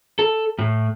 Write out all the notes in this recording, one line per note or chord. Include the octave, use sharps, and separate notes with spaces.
A4
A2